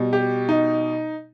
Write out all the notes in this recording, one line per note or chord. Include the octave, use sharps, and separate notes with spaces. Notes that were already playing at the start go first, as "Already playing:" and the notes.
Already playing: B2 G3
G4
D#4